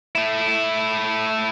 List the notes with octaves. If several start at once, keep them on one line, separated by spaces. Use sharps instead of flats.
A3 E4